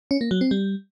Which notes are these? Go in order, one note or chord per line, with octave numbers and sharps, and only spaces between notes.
C#4
A#3
F#3
C4
G3